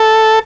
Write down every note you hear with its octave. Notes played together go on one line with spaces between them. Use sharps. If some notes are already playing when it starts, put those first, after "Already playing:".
Already playing: A4